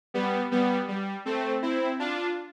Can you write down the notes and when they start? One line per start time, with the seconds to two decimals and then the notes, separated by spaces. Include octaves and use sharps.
0.14 G3 B3
0.51 G3 B3
0.88 G3
1.25 A3 C4
1.62 C4 E4
1.99 D4 F4